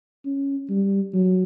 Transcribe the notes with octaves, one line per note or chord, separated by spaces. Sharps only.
C#4
G3
F#3